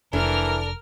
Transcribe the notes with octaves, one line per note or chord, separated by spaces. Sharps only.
F1 E3 D4 A4 A#4 F6